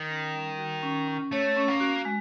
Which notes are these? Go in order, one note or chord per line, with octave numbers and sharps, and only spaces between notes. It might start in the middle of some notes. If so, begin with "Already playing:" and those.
Already playing: D#3
C#4
G3
F#4
C#4
C#4
A3 C#5
C#4
A#3
F#4
G#3